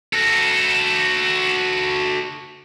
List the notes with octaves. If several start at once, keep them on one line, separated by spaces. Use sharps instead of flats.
F#4 A4